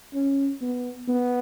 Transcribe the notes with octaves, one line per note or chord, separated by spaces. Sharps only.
C#4
B3
B3